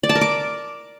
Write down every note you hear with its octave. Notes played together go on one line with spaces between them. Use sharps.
D5
A5
A#4
D6